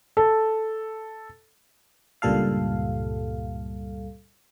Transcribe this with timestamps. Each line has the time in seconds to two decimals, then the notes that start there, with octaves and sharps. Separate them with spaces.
0.17 A4
2.22 C#2 G2 A#2 G3 A4 F5